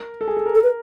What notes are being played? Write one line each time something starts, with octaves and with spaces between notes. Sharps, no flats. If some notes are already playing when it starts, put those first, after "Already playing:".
Already playing: A#4
A4
G#4
A4
A#4
A4
B4